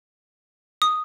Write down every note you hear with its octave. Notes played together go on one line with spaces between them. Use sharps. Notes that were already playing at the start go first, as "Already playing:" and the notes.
D#6